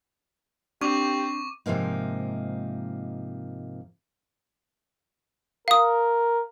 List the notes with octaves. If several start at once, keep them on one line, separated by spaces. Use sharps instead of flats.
C4 D4 G4 C#6 D6
G#2 C3 F3 A#3 D#4
A#4 F5 D#6